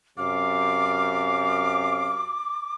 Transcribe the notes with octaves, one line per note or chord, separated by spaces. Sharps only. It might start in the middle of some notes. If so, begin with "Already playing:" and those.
F#2 C3 F5 D6